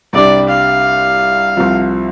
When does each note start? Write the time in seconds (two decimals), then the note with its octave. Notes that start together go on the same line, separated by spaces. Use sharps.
0.13 C2 C3 G3 D4 D5
0.49 F5
1.57 C2 C3 F3